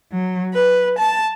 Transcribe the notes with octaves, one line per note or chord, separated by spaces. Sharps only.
F#3
B4
A5